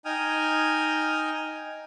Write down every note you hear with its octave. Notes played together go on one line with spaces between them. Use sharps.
D#4 G5 G#5 D#6 F6